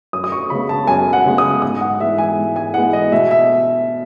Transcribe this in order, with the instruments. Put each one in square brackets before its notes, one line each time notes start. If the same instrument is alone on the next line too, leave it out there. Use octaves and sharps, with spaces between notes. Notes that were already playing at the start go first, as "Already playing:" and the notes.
[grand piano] F#2 D#6
D#6
C#6
C#3 G#3 B3 B5
A5
F#2 G#5
F#5
C#3 G#3 B3
D#6
G#2 D#6
F#5
E3 G#3 B3 E5
G#5
G#2
G#5
E3 G#3 B3 F#5
D#5
B2 E5
E5